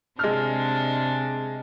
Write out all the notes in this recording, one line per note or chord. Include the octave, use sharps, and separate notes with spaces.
C3 G#3 D4 F6